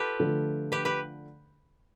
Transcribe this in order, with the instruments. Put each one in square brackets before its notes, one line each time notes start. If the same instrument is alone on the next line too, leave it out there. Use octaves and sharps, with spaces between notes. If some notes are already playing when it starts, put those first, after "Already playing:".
Already playing: [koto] F4 G4 A4 B4
[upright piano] D3 F3 A3
[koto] G4 B4
G4 B4